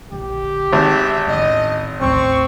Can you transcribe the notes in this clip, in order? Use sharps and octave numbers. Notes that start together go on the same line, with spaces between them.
A#1 D3 G4
G#1 D#3 E5
E1 A1 D#5
A1 D#2 C4 C#6